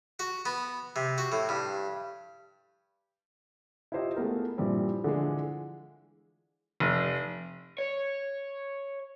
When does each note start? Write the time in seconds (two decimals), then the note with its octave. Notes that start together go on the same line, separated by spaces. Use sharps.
0.19 F#4
0.46 B3
0.96 C3
1.18 F#4
1.32 A2
1.49 G2
3.92 E4 F4 G4 C5 D#5 E5
4.16 G#3 A3 B3 A#4
4.58 G2 A#2 E3 F3 G3 C4
5.04 D3 E3 F3 G#3
6.80 F1
7.79 C#5